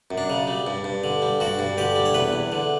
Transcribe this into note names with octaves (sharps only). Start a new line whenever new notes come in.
F#2
D4
C#3
G3
G2
G2
D3
G3
G2 F#4
G2
D3 G4
G3
C#5
E2 B4
E2
D3